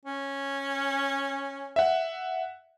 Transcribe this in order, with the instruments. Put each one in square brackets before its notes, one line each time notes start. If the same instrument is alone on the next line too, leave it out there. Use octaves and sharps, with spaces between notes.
[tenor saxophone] C#4
[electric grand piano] E5 F#5